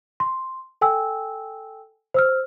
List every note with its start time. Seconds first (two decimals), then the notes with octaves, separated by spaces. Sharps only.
0.20 C6
0.81 A4 G5 G#5 E6
2.14 C5 E6 F6